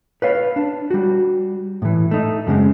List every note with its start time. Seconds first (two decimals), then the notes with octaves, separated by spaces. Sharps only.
0.22 B4 C#5 F5
0.56 D4
0.91 G3 F#4
1.82 A2 E3
2.11 A3 D#4
2.47 F#2 C#3 G#3 C4